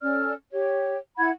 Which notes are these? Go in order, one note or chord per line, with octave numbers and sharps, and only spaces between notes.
C#4 A4 D5 F6
G4 C#5
E4 F#5 B5 G#6